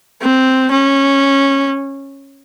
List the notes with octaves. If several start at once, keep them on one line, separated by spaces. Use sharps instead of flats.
C4
C#4